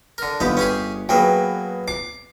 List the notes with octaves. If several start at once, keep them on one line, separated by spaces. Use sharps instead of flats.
D3 A#4
G1 D#2 B3 G4
C#4 G4 G#4
F#3 A#3 B3 G#4 B4 G5
D6 C7